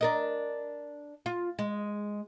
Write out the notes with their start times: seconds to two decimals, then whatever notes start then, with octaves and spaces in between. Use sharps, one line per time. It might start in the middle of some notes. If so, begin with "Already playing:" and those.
0.01 D4 A#4 D#5
1.26 F4
1.59 G#3